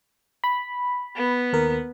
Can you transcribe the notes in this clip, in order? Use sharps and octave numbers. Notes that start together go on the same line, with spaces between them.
B5
B3
D#2 A#4